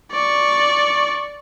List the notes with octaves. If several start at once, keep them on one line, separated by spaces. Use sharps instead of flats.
D5 C#6